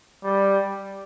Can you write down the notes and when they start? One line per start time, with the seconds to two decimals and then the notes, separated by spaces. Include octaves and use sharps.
0.24 G3